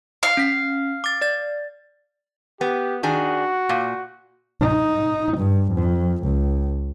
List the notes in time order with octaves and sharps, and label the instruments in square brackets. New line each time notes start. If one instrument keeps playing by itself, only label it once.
[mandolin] F5
[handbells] C#4 B6
D6 A6
D5 A6
[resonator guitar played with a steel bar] B3 [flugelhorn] G4
[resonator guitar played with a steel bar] D#3 D4 G#4 [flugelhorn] F#4
[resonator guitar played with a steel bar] A#2
[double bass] D#4
G2
F2
C#2